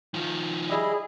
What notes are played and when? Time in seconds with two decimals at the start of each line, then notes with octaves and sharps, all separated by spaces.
0.14 D#3 F3
0.70 G3 E4 G#4 D#5